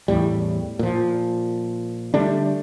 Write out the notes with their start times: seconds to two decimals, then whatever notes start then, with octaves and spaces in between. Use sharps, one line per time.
0.08 E2 A2 G3
0.79 A#2 F3
2.14 D3 G3 A3 D4